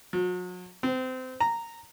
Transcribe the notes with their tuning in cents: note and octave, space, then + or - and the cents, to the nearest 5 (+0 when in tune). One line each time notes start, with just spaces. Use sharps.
F#3 -40
C4 -25
A#5 -10